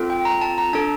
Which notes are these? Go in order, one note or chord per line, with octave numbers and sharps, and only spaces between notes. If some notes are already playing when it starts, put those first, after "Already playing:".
Already playing: C4 F4 A4
G5
A#5
A5
A#5
D4 A4 A5